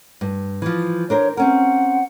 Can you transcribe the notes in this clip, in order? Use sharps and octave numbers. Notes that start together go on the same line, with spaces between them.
G2
E3 F3
D4 A#4 C5 C#5
C4 C#4 A#4 F#5